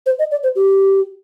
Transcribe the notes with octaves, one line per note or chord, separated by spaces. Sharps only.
C5
D#5
D5
C5
G4